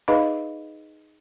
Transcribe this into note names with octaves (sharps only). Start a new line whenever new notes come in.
D#4 G#4 B4 D#5 F5 B5